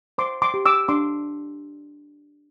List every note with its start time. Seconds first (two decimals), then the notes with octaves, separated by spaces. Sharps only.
0.18 C5 C6 D6
0.42 C6 D6
0.54 G4
0.66 D6 E6
0.88 D4 C6 D6